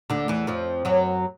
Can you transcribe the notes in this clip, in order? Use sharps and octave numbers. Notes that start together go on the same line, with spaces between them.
D2 D3
E2 E3
F2 F3
F#2 F#3